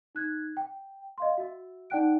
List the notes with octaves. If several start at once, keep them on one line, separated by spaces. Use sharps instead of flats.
D#4 F#6 G#6
G5
D#5 F5 C6
F#4 E5
D#4 D5 F#5 G5 F#6 D7